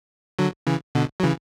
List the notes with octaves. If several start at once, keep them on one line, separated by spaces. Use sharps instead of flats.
D3 F#3
C#3 E3
B2 D3
F#3
C#3 E3